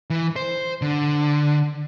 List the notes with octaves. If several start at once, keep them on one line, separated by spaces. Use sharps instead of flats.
E3
C5
D3